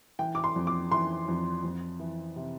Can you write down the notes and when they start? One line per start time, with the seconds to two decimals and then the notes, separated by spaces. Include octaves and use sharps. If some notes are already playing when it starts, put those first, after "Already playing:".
0.19 E3 G5
0.35 D6
0.44 C6
0.56 F2
0.67 D6
0.91 E3 C6
1.28 F2
1.64 F2
2.00 E3
2.36 C3